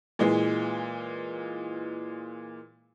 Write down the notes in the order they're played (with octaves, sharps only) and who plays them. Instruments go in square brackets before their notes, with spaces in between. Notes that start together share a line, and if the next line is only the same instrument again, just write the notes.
[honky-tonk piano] A#2 E3 G#3